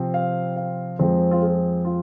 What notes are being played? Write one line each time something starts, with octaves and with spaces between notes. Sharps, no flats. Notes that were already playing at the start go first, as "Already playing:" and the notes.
Already playing: C3 F3 C4
F5
F5
F2 F3 G#3 C4
F4
G#4
F4